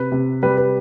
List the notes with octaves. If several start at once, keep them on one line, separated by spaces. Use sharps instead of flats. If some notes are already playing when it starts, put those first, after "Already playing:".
Already playing: C3 B4
C3
G3 B4
B4